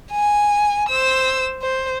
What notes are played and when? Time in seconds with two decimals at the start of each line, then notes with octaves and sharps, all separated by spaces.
0.12 G#5
0.89 C5 E6
1.62 C5